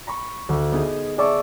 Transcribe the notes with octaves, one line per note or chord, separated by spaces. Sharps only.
A#5 B5 C#6
D2
B3 D#4 G#4
G#4 D5 E5 A5 C#6